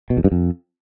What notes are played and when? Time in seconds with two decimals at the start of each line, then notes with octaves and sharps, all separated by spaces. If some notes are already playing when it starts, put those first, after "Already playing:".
0.10 B2
0.17 E2
0.24 G2
0.32 F2